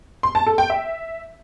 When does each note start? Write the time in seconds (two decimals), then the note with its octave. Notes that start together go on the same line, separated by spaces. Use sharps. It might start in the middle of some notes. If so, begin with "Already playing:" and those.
0.23 C6
0.35 A5
0.47 A4
0.58 G5
0.70 E5